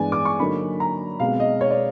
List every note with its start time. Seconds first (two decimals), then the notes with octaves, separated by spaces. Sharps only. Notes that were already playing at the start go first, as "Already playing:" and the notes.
Already playing: G2 E3 G#3 B3 D5 G#5
0.12 D6
0.25 C#6
0.39 D3 F#3 A#3 D#4 B5
0.80 A#5
1.20 B2 G#3 C4 F5
1.40 D#5
1.61 C#5
1.71 D5